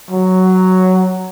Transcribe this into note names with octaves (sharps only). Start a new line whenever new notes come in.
F#3